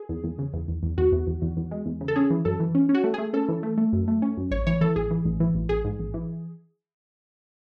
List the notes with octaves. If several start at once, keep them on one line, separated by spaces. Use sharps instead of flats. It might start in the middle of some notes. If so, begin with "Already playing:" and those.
Already playing: G#4
E2
E2
C#3
E2
E2
E2
E2 F#4
E2
E2
E2
E2
G#3
E2
C#3
A4
C#4 G#4
E3
F#2 A4
E3
C#4
C#4
F#4
A3
A3 G#4
C#4 A4
E3
A3
A3
F#2
A3
C#4
F#2
A1 C#5
E3 C#5
E3 A4
A1 G#4
E3
A1
E3
A1
A1 G#4
G#2
A1
E3